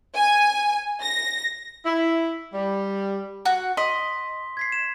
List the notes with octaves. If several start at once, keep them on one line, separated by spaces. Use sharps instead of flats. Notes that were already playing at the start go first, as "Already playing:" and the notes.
G#5
A#6
E4
G3
F#4
D#5 C6 B6
G#6 B6 C7
E7